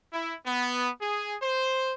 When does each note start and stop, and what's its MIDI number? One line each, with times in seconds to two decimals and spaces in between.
0.13 0.36 64
0.46 0.90 59
1.01 1.35 68
1.42 1.93 72